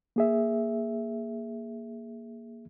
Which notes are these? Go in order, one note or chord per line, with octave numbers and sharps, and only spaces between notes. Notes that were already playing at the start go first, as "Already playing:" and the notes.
A#3 G#4 E5